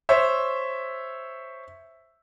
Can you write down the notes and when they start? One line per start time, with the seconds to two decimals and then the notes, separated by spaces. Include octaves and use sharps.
0.09 C5 C#5 E5